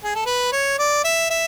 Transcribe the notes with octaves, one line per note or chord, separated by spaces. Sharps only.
G#4
A4
B4
C#5
D5
E5
E5